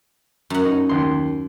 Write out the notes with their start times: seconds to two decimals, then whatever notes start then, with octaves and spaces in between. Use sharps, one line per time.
0.50 F#2 F#5
0.65 D#4
0.89 D#2 C6